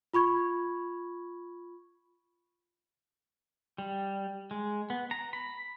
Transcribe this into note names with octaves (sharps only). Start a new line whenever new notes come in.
F4 B5 C#6 G#6
G3
G#3
B3
A#5
B5